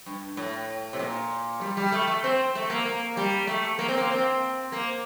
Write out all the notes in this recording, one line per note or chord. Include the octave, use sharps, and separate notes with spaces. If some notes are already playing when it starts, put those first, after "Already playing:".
G2
A2
C3
A#2
G3
G3
A3
A3
C4
A3
A#3
A#3
G3
A3
A#3
C4
A#3
C4
A#3